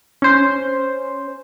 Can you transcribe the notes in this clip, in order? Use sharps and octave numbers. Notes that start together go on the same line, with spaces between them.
C#4 C5